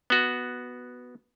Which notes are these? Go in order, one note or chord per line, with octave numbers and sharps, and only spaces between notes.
B3 F#4